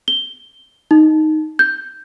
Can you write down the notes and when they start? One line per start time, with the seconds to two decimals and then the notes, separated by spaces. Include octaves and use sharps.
0.08 G7
0.91 D#4
1.59 G6